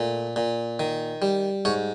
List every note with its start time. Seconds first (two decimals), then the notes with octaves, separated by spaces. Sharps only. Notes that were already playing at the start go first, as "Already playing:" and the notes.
Already playing: A#2 A3
0.36 A#2
0.79 D#3
1.22 G3
1.65 G#2 C#5